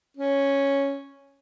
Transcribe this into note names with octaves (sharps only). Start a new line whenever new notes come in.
C#4